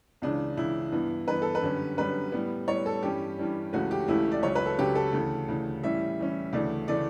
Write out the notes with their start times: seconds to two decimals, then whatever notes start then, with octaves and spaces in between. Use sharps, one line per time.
0.22 C#2 C#3 E3 D4
0.57 C#2 C#3 E3 E4
0.92 G2 E3 B3
1.28 G2 E3 B3 B4
1.42 A4
1.55 B4
1.62 F#2 D3 G3 C#4
1.97 F#2 D3 G3 C#4 B4
2.32 A2 G3 B3
2.68 A2 G3 B3 C#5
2.86 A4
3.02 G2 E3 G3 C#4 G4
3.38 G2 E3 G3 C#4
3.73 C#2 C#3 E3 A3 C#4 F#4
3.91 G4
4.08 C#2 C#3 E3 A3 C#4 E4
4.32 D5
4.42 C#2 C#3 F#3 C#4 C#5
4.55 B4
4.66 A4
4.78 C#2 C#3 F#3 C#4 G4
4.95 A4
5.13 D2 C#3 E3
5.48 D2 C#3 E3
5.83 A2 E3 G3 C#4 E5
6.19 A2 E3 G3 C#4
6.53 D2 C#3 E3 A3 D5
6.88 C#3 E3 A3 D5